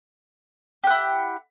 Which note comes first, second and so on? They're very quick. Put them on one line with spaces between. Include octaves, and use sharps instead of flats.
G4 F#5 E4